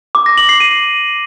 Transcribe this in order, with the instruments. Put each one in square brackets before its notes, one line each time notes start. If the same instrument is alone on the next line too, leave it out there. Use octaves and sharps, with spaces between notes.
[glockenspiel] D6
A#6
F#7
C7
D#7